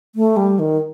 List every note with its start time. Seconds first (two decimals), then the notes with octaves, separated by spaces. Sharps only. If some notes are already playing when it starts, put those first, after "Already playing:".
0.15 A3
0.37 G3
0.59 D#3